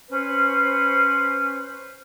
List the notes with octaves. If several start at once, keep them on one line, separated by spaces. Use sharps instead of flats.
C#4 B4 C5